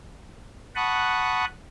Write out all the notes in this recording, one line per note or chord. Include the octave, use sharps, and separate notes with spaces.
F#5 A5 B5 C#6 D#6 F#6